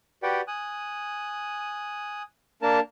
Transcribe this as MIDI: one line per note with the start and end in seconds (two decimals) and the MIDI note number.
0.23 0.41 66
0.23 0.41 67
0.23 0.41 71
0.23 0.41 74
0.23 0.41 78
0.23 0.41 79
0.48 2.23 80
0.48 2.23 87
0.48 2.23 90
2.62 2.80 58
2.62 2.80 62
2.62 2.80 70
2.62 2.80 81